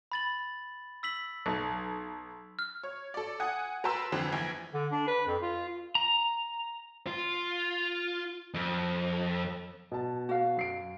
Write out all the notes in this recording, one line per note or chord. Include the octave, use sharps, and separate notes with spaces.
B5 A6 F#7
E6 B6 F#7
B1
F6
C#5
A4 D5
F#5 G#5 D#6
A#4 B4 A5 C6 E6
F2 D3 E3 C4
A#1 E3 G#5 G#6
D3
D4
B4
F2
F4
A#5
F4
F2
B2 A5
F#4 F5
F#2 C7 D7